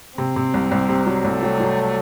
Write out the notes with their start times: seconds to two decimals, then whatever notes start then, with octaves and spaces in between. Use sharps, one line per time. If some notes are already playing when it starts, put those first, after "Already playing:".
0.18 C3 C4
0.36 C3
0.54 C2
0.71 C2
0.89 C3
1.07 F#3
1.24 C2 A3
1.42 F#3
1.60 F#3